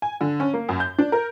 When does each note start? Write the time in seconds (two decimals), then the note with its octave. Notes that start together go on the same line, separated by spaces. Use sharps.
0.02 G#5
0.21 D3
0.40 C#4
0.54 A#3
0.69 F#2
0.80 G6
0.98 D4
1.12 A#4